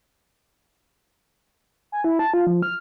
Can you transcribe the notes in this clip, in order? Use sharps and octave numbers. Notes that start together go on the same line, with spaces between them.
G#5
E4
A5
F4
F3
F6